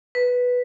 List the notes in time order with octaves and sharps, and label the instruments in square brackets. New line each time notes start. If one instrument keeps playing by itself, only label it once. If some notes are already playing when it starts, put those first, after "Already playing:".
[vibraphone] B4